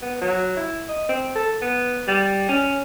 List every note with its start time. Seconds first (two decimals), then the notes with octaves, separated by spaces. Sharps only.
0.02 B3
0.22 F#3
0.57 E4
0.89 D#5
1.09 C4
1.35 A4
1.62 B3
2.08 G3
2.49 C#4